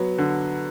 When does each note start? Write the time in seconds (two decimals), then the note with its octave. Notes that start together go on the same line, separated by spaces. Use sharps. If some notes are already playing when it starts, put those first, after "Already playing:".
Already playing: F#3 B3
0.18 D3